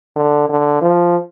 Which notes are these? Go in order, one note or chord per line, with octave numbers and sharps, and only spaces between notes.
D3
D3
F3